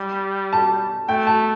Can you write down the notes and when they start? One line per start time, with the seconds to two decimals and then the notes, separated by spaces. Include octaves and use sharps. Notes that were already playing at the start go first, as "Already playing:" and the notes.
Already playing: G3
0.53 A5
1.09 A3 G5
1.27 A5